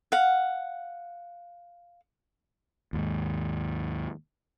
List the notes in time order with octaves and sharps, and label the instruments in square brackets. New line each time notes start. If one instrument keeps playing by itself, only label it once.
[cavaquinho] F5 F#5
[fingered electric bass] D#2 G#2